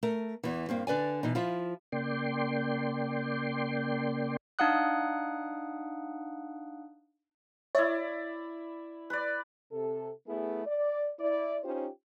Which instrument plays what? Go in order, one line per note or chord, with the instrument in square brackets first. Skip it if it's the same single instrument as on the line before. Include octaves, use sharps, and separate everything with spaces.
[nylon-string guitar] A3 A#4
E2 E3
G2 A#3 C4
D3 B4 D5 G#5
B2 E3 D#4
F3 E4 F4
[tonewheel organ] C#3 A#3 D5 G5 C6
[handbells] D4 D#4 F5 F#5 D#6 F#6
[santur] E4 D5 [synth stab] C#5 E5
[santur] B4 D5
[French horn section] C3 A4
A3 B3 E4 G#4
D5
E4 D5
C#4 D#4 F4 G4 C5